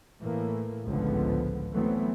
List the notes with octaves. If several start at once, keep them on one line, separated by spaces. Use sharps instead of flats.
A2 E3 A3 A#3
G#1 C#2 A2 D3 F3 B3
E3 F#3 A3 B3 C4